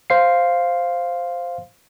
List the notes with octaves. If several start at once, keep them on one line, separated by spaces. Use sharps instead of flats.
C5 F5 C7